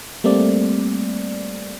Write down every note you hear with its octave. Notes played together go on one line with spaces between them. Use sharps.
G3 A3 A#3 C4 D5